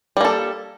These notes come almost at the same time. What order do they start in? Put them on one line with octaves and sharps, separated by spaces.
G3 A#3 A4